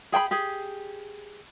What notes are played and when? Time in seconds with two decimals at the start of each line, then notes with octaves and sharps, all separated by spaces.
0.12 G#4 G5 A5 B5
0.31 G4 G#4